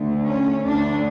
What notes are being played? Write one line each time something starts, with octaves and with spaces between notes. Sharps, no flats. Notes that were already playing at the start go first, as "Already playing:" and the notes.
Already playing: D2 D3 A3
C#4
D2 D3 A3 D4